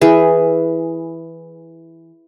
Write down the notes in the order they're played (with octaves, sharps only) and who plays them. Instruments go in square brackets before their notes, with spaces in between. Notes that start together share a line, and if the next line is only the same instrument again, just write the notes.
[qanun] E3 G#4